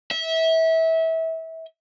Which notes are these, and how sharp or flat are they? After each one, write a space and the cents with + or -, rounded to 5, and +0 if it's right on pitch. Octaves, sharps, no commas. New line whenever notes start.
E5 -25